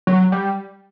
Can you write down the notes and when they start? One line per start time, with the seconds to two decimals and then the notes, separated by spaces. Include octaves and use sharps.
0.07 F#3
0.32 G3